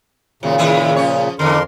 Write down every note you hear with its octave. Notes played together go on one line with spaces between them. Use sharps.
D#2 A#2 C#3 F#3
D#3 E4 G#4
F3 C#4 C#5
F2 D3 E3 A#4 C6